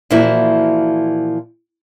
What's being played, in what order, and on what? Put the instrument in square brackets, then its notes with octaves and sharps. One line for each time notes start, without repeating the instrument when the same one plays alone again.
[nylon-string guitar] A#2 E3 F3 A#3 E4 F#4